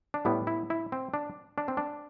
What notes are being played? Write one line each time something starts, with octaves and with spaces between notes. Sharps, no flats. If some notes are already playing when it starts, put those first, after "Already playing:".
D4
A2 G3 B3 E4
E4
E4
C4
D4
D4
C4
D4